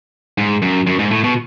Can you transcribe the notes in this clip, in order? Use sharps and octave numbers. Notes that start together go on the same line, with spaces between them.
G#2
F#2
F#2
G#2
A2
B2